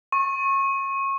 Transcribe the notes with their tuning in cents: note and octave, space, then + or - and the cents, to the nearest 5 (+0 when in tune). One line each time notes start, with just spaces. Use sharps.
C#6 -25